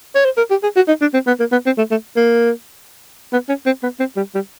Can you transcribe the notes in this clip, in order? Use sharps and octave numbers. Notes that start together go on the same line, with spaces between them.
C#5
C5
A#4
G4
G#4
F#4
D#4
D4
C4
B3
A#3
B3
C4
A3
A3
A#3
B3
C#4
C4
B3
C4
G3
G3